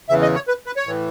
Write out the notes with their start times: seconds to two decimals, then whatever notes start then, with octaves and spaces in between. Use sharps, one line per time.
0.09 E2 C#3 E3 E5
0.22 D#5
0.35 C#5
0.48 B4
0.66 B4
0.77 C#5
0.86 A2 E3